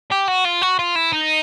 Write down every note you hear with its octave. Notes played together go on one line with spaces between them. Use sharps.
G4
F#4
F4
F#4
F4
E4
D#4